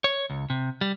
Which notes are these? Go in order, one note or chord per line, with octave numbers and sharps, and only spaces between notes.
C#5
C#2
C3
G3